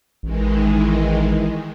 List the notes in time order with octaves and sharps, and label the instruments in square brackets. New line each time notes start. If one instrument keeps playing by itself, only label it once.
[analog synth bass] A1 [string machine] D#3 E3 G#3